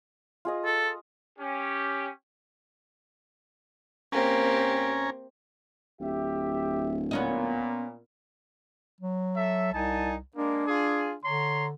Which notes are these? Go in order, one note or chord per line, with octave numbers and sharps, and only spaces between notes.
F4 G#4 D#5
A4
C#4 G4
A#3 C4 C#4 G4 G#5 A#5
D1 G4 E5
A#2 B3 C#4 D#5
F#3
A4 E5
C2 D#4 G#5 A5
G#3 A#3 D4
F4 G#4
D3 C#5 A#5 C6